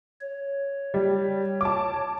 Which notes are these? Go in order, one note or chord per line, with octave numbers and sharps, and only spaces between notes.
C#5
G3
A5 D6